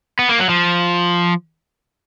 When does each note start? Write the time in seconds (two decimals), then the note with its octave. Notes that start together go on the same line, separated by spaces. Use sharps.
0.19 B3
0.29 A#3
0.40 F#3
0.49 F3